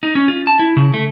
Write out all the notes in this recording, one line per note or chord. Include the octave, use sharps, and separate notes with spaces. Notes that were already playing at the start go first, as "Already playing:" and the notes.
D#4
C#4
F4
A5
E4
C#3
A3